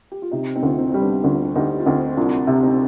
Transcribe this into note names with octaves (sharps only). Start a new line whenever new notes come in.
G4
F4
C3 C4 D#4
C4 D#4
D2 F4
C4 D#4
G3 D#4
B3 D4
D2 D4 F4
D2 D#4 G4
F4
D2 C4 D#4
C2 D4 F4
C3
C4 D#4